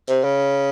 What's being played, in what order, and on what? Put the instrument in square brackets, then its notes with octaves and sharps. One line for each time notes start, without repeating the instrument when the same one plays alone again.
[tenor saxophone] C3
C#3